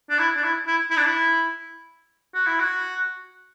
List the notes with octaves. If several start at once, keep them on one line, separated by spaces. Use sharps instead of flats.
D4
E4
D4
E4
E4
E4
D4
E4
F#4
E4
F#4